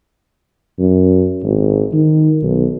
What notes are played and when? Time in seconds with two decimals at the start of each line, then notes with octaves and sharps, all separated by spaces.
0.78 F#2
1.43 G#1
1.93 D#3
2.42 B1